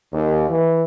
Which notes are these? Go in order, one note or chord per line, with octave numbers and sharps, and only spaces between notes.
D#2
E3